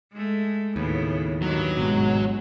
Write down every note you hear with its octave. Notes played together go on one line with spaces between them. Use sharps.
G#3 A3
D#2 A2 C#3 B3
G2 D#3 F#3
G#1 B2 G#3